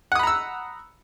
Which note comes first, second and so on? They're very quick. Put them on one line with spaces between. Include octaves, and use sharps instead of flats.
F#5 D#6 B5 A#5 E6